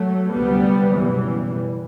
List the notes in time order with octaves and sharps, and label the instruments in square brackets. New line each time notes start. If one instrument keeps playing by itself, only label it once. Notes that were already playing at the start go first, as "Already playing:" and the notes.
Already playing: [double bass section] F#3 A3
D2 C3 G3 B3
F#1 E2 B2 E3 G3